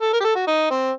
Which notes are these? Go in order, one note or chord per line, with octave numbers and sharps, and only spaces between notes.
A4
A#4
G4
A4
F#4
D#4
C4